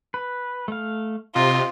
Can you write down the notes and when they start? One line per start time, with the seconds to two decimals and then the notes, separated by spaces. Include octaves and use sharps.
0.14 B4
0.68 A3 F5
1.36 C3 F4 D#5